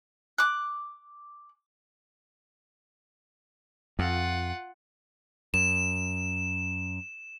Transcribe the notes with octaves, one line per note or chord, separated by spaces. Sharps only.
D6 F#6
F2 F4 F#5
F#2 E7